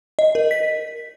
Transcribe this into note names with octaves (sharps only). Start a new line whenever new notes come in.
D#5
A#4
B6